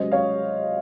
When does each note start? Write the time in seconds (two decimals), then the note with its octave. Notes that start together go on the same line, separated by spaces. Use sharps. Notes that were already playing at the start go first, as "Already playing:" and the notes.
Already playing: C#2 C3 F#3 C#4 C5 D#5
0.12 C#5 F5